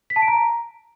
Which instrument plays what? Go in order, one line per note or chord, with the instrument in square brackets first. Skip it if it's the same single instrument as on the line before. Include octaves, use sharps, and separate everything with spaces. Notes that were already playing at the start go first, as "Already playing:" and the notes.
[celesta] B6
A5
D7
A#5